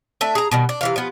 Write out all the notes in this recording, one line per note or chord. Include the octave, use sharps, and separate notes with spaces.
A3 D4 E5
G#4 A#5
B2 D#3 G3
D4
C3 E3 F5
F3 B3